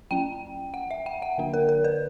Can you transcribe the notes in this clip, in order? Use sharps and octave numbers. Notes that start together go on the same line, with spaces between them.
F#3 C#4 G5
F#5
E5
G5
F#5
D3 A#3 D4
A#4
A#4
B4